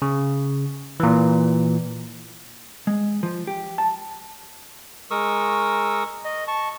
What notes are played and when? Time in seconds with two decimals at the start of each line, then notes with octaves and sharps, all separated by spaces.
0.02 C#3
1.00 A#2 E3
2.87 G#3
3.23 F3
3.47 G4
3.78 A5
5.11 G#3 A#4 C#6 D#6 E6
6.25 D#5
6.48 A5 C#6